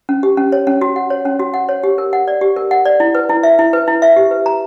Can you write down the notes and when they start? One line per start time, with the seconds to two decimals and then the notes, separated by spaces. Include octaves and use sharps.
0.09 C#4
0.23 G4
0.37 C#4
0.52 C#5
0.67 C#4
0.81 F#4
0.96 F#5
1.10 C#5
1.25 C#4
1.40 F#4
1.54 F#5
1.69 C#5
1.83 G4
1.98 A#4
2.13 F#5
2.28 D5
2.41 G4
2.56 A#4
2.71 F#5
2.86 D5
3.00 E4
3.15 B4
3.29 E4
3.43 E5
3.59 E4
3.73 B4
3.88 E4
4.02 E5
4.16 G4
4.31 B4
4.46 A#5